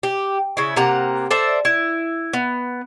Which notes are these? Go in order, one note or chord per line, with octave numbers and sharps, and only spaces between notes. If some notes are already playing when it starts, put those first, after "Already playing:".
G4
C#3 E4
C3 A#3 F#5 A#5
A4 C5 D5 E5
E4
B3